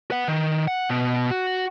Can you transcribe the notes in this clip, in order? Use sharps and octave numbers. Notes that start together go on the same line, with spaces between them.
B4 F#5
D#3
F#5
B2
F#4